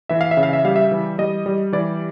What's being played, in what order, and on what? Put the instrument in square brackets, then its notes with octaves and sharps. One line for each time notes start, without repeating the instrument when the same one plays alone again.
[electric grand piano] E3 E5
F5
E5
C#3
F5
E5
G3 F5
E5
E3
G3 D#5
G3
E3 D5